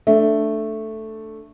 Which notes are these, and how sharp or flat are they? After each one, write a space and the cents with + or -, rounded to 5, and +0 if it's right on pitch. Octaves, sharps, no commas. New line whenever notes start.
A3 +0 D4 +0